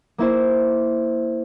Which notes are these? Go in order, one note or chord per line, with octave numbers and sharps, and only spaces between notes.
A#3 E4 C5